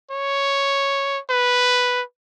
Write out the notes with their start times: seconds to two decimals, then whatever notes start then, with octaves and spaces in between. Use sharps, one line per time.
0.12 C#5
1.31 B4